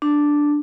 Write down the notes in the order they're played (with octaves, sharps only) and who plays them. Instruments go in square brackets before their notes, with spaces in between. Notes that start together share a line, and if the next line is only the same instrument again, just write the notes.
[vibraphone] D4